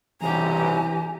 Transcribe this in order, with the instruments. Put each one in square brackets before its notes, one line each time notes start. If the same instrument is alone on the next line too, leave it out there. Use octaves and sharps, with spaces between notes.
[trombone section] B1 G2 C3 [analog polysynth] E3 [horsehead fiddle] G4 A#5 [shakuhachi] G#5